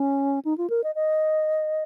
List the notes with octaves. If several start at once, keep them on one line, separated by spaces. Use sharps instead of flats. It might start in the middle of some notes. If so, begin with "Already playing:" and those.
Already playing: C#4
D#4
F4
A#4
D#5
D#5